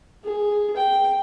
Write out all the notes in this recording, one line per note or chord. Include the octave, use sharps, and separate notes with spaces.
G#4
G5